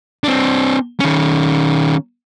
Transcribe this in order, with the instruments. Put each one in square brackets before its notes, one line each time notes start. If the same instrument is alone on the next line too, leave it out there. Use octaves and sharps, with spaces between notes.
[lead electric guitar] C4 D4
D#3 C#4